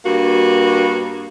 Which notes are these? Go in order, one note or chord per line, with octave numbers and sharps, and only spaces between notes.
G2 A#3 F#4